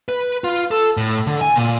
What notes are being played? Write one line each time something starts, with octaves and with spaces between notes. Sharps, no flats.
B4
F4
A4
A2
D3
G#5
A#2